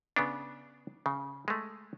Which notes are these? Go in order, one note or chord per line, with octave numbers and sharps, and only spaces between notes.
C#3 B3 D4
C#3
G#3 A3